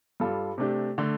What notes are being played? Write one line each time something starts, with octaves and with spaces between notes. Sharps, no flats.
G2 G3 F4 A4
C3 A3 D4 G4
D3 A3